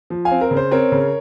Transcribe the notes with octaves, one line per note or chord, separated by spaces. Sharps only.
F3
F5 G#5
C4
A#4
C#3
C5
C4 A#4 C#5
C#3